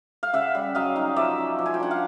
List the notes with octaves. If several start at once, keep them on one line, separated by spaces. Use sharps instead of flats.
F5
C#3 E5 F#5
G3
F#3 D#5 F5
D#4
F3 D5 E5
C#4
F3
G#5
G5
D4 F#5
F5